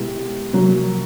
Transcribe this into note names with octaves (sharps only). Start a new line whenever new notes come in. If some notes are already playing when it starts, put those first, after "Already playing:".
Already playing: B2 G#3 B3 E4 G4
C3 F3 F#3 A#3